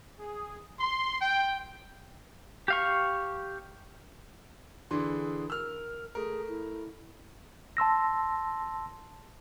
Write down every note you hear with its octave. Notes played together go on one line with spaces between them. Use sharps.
G#4
C6
G5
G4 F5 C#6
D3 E3 G#4 C6
A#4 E6 F6
A3 G#4 A#4
E4
A5 C6 E6 A#6